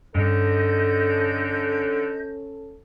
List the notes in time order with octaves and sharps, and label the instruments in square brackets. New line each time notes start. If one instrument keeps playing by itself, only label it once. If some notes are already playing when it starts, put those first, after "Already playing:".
[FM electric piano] G2 [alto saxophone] D3 [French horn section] C#4 A4 [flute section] D#5 G6